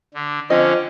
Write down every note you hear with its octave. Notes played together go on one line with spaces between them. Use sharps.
D3
D3 F3 C4 C#4 D#5